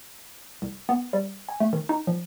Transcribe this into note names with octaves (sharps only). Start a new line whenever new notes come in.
C2
B3
G3
G#5
A3
D#3
D#4
F3